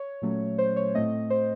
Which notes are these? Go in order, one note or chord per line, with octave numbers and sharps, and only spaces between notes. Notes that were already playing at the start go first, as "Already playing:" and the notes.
Already playing: C#5
A#2 F#3 A3 C#4
C5
C#5
A2 A3 C4 D#5
C5